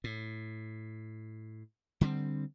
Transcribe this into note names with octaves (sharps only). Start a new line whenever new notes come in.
A2
D3 G3 A3 C4